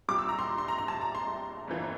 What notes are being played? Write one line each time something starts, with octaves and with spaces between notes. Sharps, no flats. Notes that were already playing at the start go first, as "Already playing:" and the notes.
C2 A#2 G3 D6
E6
A#5
C6
C6
A#5
A#5
A5
A#5
C6
G1 F2 E3 A#3